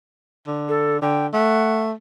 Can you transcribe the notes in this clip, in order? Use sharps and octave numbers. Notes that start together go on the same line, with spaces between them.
D3
A4
D3 G5
A3 F#5